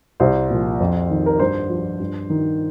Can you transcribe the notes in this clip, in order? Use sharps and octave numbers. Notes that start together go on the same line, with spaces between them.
C2 C5
A#2 F3
F2
D#3
A#4
G2 C5
F3
G2
D#3